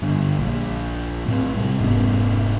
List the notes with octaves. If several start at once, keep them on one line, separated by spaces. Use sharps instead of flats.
G2 D3
A#1
A2 C4
C3 G3
F1 G#2 B3 C#4